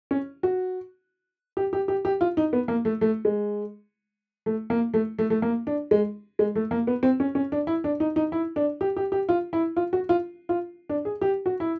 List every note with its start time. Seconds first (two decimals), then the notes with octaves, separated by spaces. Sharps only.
0.11 C#4
0.43 F#4
1.57 G4
1.73 G4
1.88 G4
2.05 G4
2.21 F4
2.37 D#4
2.53 B3
2.68 A#3
2.85 A3
3.01 A3
3.25 G#3
4.46 A3
4.70 A#3
4.94 A3
5.19 A3
5.30 A3
5.42 A#3
5.67 D4
5.91 G#3
6.39 G#3
6.56 A3
6.71 A#3
6.87 B3
7.03 C4
7.20 C#4
7.35 C#4
7.52 D4
7.67 E4
7.84 D4
8.00 D#4
8.16 D#4
8.32 E4
8.56 D4
8.81 G4
8.97 G4
9.12 G4
9.29 F4
9.53 E4
9.77 F4
9.93 F#4
10.09 F4
10.49 F4
10.89 D4
11.05 G#4
11.21 G4
11.46 F#4
11.60 E4